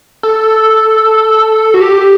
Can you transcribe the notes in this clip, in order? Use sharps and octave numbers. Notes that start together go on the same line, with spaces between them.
A4
F#4
G4